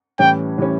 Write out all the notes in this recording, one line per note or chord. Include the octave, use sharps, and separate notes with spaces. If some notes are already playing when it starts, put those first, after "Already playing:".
A2 E3 G3 C#4 G5
A2 E3 G3 C#4